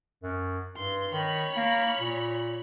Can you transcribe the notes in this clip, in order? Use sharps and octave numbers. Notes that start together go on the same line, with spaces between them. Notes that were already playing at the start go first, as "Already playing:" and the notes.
F#2
G2 C6
D#3 C#5 B5
A#3
A#2